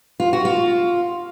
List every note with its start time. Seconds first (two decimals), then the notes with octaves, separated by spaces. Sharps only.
0.20 F4
0.33 F#4
0.45 F4